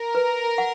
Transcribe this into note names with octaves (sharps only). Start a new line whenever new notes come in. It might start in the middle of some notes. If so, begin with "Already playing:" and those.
Already playing: A#4
B4
F#5